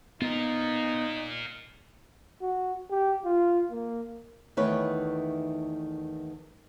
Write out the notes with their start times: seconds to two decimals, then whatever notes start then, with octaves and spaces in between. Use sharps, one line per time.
0.22 B3 D#4 F4 A#4
2.42 F#4
2.90 G4
3.25 F4
3.71 A#3
4.57 E2 D#3 A3 B4 C#5